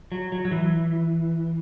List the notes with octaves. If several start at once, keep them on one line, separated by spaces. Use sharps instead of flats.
F#3
F#3
F#3
E3